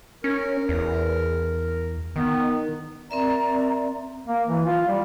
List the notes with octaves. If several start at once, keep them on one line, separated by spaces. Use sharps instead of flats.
C#4 A#4
E2
D#3 B3
C4 A#4 D5 E5 A#5
A#3
E3
F4
G3